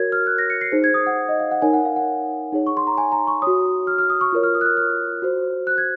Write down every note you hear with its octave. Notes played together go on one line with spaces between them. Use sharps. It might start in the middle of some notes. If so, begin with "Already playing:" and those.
Already playing: F#4 A#4 C#5 G#6
F6
F#6
A#6
C#7
C7
D#4 G#4 C5
G#6
D#6
F#5
D#5
F5
F#5
D#4 A#4 C#5 G#5
F#5
F5
F#5
D#4 G#4 C#5
C#6
C6
A#5
G#5
A#5
C#6
F#4 C#5 D#6
F6
F6
D#6
C#6
F4 A#4 C#5
F6
D#6
F#6
F6
F6
F#4 C5
F#6
G#6